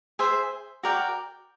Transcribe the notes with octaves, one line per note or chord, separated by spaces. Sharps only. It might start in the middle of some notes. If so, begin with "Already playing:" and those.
G#4 C5 E5
F#4 A#4 D5 G5